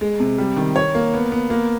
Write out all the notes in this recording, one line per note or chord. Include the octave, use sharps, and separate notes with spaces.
G#3
C3
G3
D#3
C#5
A#3
B3
B3
A#3